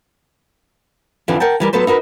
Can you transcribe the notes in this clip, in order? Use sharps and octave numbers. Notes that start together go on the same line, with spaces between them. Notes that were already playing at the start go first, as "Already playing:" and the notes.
F2 D3 E3 F3
A#4 F#5 G5 A5
E3 G3 A#4
F#3 B3 A4 B4 C5
D#4 F#4 A#4 B4